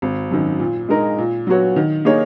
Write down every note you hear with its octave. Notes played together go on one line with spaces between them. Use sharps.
G#1
F#2 D#3
A#2
G#3 D#4 A#4
A#2
F#3 B3 F#4 C#5
D#3
A#3 D#4 G#4 C#5